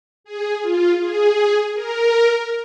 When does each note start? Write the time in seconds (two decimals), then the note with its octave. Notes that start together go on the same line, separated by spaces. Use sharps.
0.24 G#4
0.62 F4
1.00 G#4
1.74 A#4